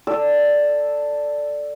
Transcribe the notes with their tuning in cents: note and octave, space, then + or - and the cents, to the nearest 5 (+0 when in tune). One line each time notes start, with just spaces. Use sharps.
A4 +10 D5 +0 E6 +0